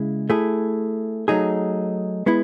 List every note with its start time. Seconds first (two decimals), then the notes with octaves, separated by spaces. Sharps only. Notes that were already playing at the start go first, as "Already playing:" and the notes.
Already playing: C#3 G#3 E4
0.30 A3 E4 G#4
1.28 F#3 A3 D#4 G#4
2.26 G#3 B3 E4